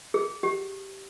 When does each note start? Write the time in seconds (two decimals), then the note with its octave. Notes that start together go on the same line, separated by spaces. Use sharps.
0.14 G#4
0.43 G4